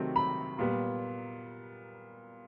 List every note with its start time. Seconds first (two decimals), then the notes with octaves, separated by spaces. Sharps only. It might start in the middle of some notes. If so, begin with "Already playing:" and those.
Already playing: C3 D#3 F#3 A3 C4
0.16 B5
0.58 A#2 G3 B3